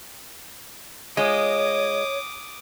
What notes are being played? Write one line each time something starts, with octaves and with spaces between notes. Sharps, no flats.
G#3 F4 C#5 D#5 D6 D#6